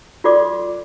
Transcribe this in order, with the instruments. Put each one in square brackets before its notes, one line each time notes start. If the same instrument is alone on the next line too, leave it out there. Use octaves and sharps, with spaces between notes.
[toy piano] F4 F#4 A4 D5 C6 D6